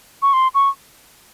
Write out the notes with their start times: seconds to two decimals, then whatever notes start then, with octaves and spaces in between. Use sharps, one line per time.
0.22 C#6
0.33 C6
0.55 C#6